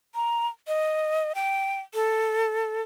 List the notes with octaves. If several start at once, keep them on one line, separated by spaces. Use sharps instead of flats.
A#5
D#5
G5
A4